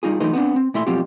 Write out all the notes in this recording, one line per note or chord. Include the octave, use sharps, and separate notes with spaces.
G3 D#4 F4 G#4
E3 F#3 A3 D#4 B4 C5
B3 C4 D4
C4
A#2 A3 E4 E5 C6
B2 F3 F#3 C4 F4 G4